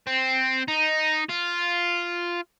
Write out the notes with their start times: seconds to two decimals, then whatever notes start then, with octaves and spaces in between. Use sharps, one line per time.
0.07 C4
0.68 D#4
1.29 F4